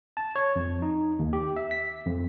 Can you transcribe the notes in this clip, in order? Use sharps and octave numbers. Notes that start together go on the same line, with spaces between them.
A5
C#5
F2
D#4
D#2
G4
E5
B6
F2